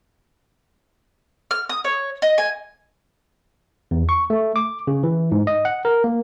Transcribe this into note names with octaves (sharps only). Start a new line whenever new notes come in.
F6
D#6
C#5
D#5
G#5
E2
C#6
A3
D6
C#3
E3
G#2
D#5
F#5
A#4
A#3